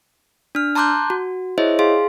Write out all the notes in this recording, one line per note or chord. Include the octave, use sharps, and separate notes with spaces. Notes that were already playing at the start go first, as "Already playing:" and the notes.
D4 F6
A5 A#5 C6 D6 F#6 G6
F#4
E4 G#4 C5 C#5 D#5 E5
G#4 F5 C6